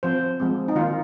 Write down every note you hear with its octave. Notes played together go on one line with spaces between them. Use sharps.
F3 C4 C5
F3 G#3 C4
D#4
D#3 A#3 F4